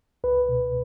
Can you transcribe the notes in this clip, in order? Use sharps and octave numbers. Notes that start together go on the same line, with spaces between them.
C#2 B4
B2